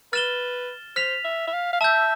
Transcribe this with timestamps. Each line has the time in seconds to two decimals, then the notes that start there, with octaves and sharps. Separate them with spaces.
0.13 B4 F6 A6 E7 G7
0.96 C5 F6 B6 F7
1.25 E5
1.48 E5
1.53 F5
1.73 F5
1.81 E5 A5 E6 G6